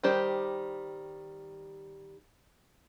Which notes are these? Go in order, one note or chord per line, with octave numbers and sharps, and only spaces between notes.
D#3 G3 G4 C5